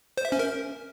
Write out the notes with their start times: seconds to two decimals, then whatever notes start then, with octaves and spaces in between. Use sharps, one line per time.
0.17 C5
0.25 E5
0.32 C#4
0.39 A#4